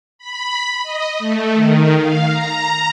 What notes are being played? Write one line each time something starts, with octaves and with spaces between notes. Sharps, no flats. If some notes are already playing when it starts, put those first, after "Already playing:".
B5
D#5
A3
D#3
F5
A#5